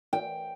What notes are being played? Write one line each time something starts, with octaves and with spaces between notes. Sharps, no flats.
G5